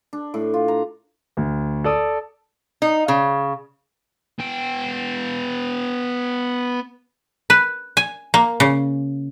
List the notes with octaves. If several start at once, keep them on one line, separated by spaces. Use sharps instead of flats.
D4
A2
F4
A#5
D2
A4 D5 D#6
D#4
C#3
B3 G5
B4
G#5
A#3
C#3